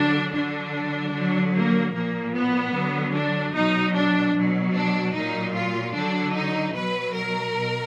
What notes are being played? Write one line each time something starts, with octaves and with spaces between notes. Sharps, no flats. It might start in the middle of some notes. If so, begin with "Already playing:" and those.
Already playing: D3 F#3 D4
D3 F#3 D4
D3 F#3
A#3
A#2 F3 A#3
B3
D3 F#3
D4
B2 F#3 D#4
D4
B2 F#3
D4
A#2 F#3 D#4
F4
D3 F#3 D4
D#4
B2 F#3 B4
A#4
B2